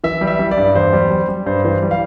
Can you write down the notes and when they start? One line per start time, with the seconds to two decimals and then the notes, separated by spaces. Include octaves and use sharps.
0.04 E3 E5
0.21 G3
0.27 E5
0.39 G3
0.51 D5
0.57 G2
0.75 E2 C5
0.93 G3
1.11 G3
1.29 G3
1.46 G2 C5
1.65 E3 C5
1.82 G3
1.91 F5